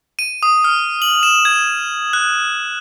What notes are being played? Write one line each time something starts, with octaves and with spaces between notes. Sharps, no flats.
D#7
D#6
F6
F#7
E7
G#6
F#6